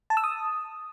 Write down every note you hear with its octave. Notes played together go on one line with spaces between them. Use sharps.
A5
E6
D#6